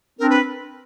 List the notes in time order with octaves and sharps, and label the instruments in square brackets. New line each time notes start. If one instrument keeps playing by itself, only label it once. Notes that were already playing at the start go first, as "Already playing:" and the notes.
[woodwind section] C4 D4 [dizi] A#4
[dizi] B4